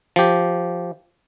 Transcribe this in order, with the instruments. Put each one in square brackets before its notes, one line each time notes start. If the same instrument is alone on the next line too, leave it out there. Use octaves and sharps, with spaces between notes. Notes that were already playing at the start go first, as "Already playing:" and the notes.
[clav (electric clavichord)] F3 G4